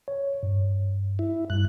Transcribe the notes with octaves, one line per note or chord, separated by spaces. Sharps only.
C#5
G2
E4
G2 F#6